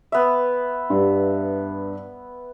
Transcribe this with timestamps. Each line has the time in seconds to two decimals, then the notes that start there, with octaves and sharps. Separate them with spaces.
0.12 B3 E5
0.90 G2